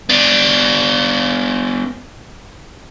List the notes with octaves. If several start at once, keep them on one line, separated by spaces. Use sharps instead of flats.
B3 D4